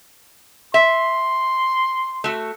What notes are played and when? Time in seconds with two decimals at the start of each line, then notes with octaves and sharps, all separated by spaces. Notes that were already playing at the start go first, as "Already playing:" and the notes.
0.74 E5 C6
2.24 A3 F#4